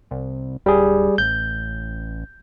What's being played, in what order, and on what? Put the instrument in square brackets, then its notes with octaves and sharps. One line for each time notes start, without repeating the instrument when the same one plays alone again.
[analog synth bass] C2
[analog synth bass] D1 [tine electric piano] G3 G#4
[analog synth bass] A1 [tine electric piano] G6